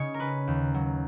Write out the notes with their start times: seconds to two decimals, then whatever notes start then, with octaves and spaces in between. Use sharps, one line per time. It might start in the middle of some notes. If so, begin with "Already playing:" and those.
Already playing: C#3 D#4 C#5 D#5
0.14 A#4
0.20 C#4 B4
0.47 D#2
0.74 F#3